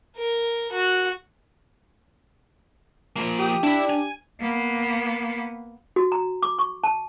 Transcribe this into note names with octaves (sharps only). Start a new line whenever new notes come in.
A#4
F#4
F3 A#3
G4 D#6
D4 E4 B5
G#5
A#3 B3
F#4
A#5
D6
C#6
A5